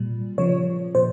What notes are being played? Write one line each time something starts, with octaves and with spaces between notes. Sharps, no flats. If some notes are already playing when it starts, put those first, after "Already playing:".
Already playing: A#2 G3
C#3 F3 C#5
A#2 C5